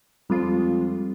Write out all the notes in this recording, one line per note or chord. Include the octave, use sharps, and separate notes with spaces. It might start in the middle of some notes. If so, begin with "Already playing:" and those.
F2 G3 G#3 F4